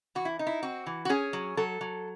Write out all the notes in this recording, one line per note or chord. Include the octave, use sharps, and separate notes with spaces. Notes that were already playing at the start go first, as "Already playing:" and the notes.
E3 F#4
E4
D#4
E4
C4 F#4
E3
F#4
C#4 G#4
F#3
F#3 A4
F#3